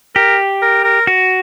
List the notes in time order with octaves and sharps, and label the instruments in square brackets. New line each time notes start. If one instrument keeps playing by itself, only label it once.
[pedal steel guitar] G4 [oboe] A#4
[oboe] A#4
A#4
[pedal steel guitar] F#4